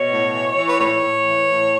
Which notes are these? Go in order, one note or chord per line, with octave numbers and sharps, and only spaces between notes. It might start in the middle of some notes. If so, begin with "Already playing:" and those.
Already playing: B2 C#5
A2
E3
E3
B4
A2 C#5
A2
E3
A2